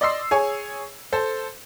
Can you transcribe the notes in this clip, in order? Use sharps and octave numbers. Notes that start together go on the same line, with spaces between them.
D5 D#5 C6 E6 C7
G#4 C#5 G#5
A4 C5